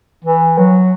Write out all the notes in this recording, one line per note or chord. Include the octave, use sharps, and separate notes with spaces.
E3
F#3